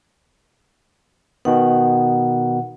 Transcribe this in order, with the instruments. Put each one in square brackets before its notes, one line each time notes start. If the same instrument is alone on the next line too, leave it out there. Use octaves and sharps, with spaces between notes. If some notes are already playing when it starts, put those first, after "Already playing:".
[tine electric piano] B2 D#3 B3 [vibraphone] F#5